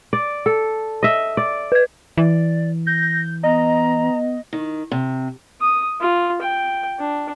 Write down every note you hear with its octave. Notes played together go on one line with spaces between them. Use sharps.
D5
A4
D#5 E5
D5
B4 G#6
E3 D5
G6 A#6
B3 D#5 A#5
D#3
C3
D#6
F4
G5
D4